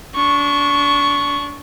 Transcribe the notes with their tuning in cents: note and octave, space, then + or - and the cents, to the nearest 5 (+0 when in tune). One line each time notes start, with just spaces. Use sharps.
D4 -30 C#6 +0